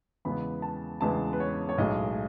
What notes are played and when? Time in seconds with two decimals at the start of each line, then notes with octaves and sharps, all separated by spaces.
0.25 E2 C#3 G#3 B3 B5
0.62 A5
1.01 E2 C#3 G#3 B3 A5
1.33 B4
1.40 C#5
1.69 C#5
1.78 B1 A2 G#3 D#5